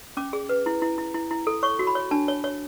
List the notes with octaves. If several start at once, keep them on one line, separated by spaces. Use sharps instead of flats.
C#4 D6
G#4
B4
E4
E4
E4
E4
E4
A4
C#5 C#6
F#4
B5
C#5
D4 A5
C#5
C#5